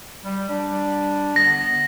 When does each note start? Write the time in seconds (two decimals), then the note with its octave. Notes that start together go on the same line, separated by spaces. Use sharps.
0.25 G3
0.50 G3 D4
1.36 D3 B3 A#6